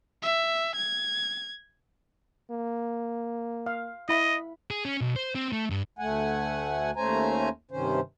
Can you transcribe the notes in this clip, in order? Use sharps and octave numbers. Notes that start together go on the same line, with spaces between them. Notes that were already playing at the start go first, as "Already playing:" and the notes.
E5
G#6
A#3
F5
E4 D#5 B5
G#4
C#4
B1
C5
C4
A3
G2
D2 A3 F#5 G#5
D#2 A3 C#4 C5 G#5 A#5
G2 C3 D#3 C#4 C5